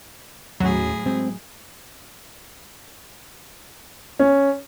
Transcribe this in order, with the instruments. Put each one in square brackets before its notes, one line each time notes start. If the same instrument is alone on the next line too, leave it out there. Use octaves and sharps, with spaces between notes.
[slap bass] D#2 C#4 [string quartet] A2 G#4 [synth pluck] F#3
[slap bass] G#3 A3 [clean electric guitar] C4
[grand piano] C#4